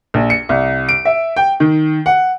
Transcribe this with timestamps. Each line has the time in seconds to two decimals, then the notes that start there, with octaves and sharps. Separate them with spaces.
0.14 A#1
0.30 C#7
0.49 C2
0.89 D7
1.05 E5
1.36 G5
1.60 D#3
2.06 F#5